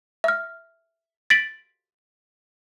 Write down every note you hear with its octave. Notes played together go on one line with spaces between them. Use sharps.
E5 F6
A6 B6 D7 F#7